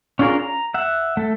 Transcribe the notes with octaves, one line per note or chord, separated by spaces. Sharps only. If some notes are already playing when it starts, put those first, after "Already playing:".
C#4 D4 F4 G#4 A#4
A#5
E5 F#5
A3 A4